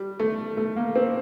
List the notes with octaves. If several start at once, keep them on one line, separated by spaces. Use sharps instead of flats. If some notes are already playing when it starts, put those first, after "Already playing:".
Already playing: G3
A3
A3
A#3
C4